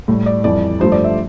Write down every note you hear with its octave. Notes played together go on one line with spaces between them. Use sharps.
A2 G3
D5
F2 E3 G3 D5
G2 F3 A3 C5
D5
E5